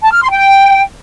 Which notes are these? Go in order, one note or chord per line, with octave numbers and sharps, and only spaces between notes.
A5
F6
C6
G5